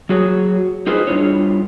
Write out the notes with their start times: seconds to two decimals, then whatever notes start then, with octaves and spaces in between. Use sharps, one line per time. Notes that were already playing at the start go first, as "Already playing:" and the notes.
0.09 F#3 F#4 G#4 C#5
0.87 D#4 F4 G#4 B4 C5 D#5
1.07 G2 C#3 D4 E4 F4 C#5